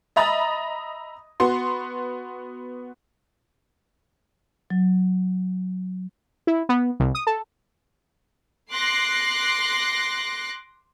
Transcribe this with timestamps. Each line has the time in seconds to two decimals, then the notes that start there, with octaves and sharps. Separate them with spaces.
0.16 D#5 E5 A#5 B5 D#6 A6
1.40 B3 F#4 C6
4.70 F#3
6.47 E4
6.69 B3
7.00 C2
7.15 D#6
7.27 A4
8.71 C6 D6 F#6 A#6 C7